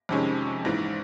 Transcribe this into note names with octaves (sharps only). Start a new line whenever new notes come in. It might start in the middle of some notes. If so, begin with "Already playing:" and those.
F2 C3 D#3 G#3 C#4
A#1 G#2 E3